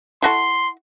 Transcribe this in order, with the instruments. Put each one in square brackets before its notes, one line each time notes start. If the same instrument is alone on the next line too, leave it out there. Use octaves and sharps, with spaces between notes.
[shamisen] E4 F#4 A4 [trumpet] C6